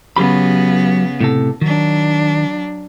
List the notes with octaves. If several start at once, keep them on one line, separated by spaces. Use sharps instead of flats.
C#3 F#3 B3 G4 B5
A2 C3 A4
D#3 F#3 D4